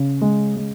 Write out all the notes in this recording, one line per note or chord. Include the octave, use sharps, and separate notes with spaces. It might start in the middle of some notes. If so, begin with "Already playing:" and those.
Already playing: C#3
G#3
G#3